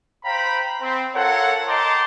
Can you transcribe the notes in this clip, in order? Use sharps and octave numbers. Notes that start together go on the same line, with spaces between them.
C5 F5 G5 A#5 B5
C4
F4 A4 A#4 C#5 F#5
D#5 G5 A5 A#5 C6 D6